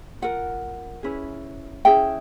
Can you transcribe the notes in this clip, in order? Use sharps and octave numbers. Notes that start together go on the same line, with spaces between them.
F4 A#4 F#5
C#4 E4 G#4 B4
C#4 E4 G#4 G5